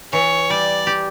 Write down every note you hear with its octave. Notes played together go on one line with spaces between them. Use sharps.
E3 C#5
G3 D5
G4